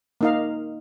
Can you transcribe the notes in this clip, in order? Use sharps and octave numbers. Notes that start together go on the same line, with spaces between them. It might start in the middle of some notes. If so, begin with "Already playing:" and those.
A#3 D#4 F5